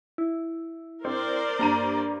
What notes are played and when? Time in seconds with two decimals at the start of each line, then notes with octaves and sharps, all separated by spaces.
0.18 E4
1.05 C4 A#4 C5 D5
1.59 G2 A#3 A#5 D#7